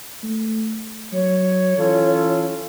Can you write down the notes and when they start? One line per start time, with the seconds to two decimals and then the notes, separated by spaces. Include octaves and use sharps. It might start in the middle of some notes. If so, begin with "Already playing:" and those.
0.23 A3
1.13 F#3 C#5
1.78 E3 C#4 F4 A4